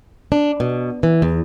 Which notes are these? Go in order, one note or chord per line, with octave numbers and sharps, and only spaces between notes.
D4
B2
E3
E2